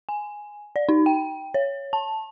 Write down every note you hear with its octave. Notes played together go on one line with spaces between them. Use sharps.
G#5
D5
D#4
G5
C#5
A5